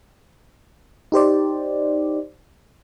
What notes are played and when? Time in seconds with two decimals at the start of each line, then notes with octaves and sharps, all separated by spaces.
1.12 D#4 G4 C5 D5